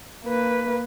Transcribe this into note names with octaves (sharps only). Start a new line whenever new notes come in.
A#3 B4